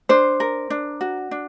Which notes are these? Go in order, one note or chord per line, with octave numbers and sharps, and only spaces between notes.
D4 C5
A#4
D4
F#4
D4